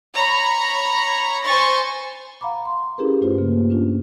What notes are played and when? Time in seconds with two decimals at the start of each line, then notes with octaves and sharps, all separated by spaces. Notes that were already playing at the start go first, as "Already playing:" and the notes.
0.14 C#5 A#5 B5
1.45 C5 G#5 C#6 A6
2.41 F5 F#5 A#5 B5 D6
2.65 C6
2.98 C#4 E4 G4 G#4 A#4 B4
3.21 G2 A3 F4 C5
3.38 C#3 A#3
3.70 C#4 D4 F4